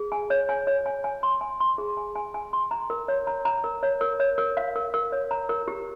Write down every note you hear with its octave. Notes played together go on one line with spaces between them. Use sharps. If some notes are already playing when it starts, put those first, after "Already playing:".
Already playing: G#4
G#5
C#5
G#5
C#5
G#5
G#5
C6
G#5
C6
G#4
G#5
G#5
G#5
C6
A#5
A#4
C#5
A#5
A#5
A#4
C#5
A#4
C#5
A#4
F5
A#4
A#4
C#5
A#5
A#4
G4